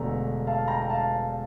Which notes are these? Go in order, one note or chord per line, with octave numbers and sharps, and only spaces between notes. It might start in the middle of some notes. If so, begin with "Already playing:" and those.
Already playing: E1 E2 D3 A3 D4 A#5
F5 A5
G5 A#5
A#5
F5 A5